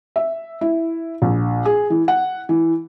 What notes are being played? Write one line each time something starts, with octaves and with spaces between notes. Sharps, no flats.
E5
E4
A#1
G#4
E3
F#5
E3